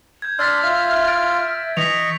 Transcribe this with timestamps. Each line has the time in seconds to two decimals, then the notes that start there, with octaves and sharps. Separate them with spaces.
0.22 G6 G#6
0.39 D4 D5 C6 E6 F6 A6 B6
0.63 F4 E5
1.04 A6 D7
1.77 E3 D#5 C#6 B6 F7